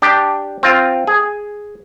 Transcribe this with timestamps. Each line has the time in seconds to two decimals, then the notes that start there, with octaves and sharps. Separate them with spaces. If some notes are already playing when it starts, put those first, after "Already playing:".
0.02 D4 G4
0.63 C4 F4
1.07 G#4